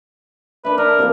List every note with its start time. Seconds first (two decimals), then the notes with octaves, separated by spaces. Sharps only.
0.65 D4 B4 E5
0.78 D4 A#4
0.99 C3 E3 A#3